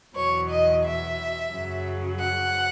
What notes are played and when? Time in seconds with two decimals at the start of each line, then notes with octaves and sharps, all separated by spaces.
0.15 E2 B2 F#3 C#5
0.50 D#5
0.84 E5
1.52 F#2 C#3 F#3
2.19 F#5